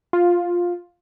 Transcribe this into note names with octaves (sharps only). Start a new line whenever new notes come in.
F4